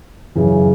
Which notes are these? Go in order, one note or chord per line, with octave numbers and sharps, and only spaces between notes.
F#2 C#3 E3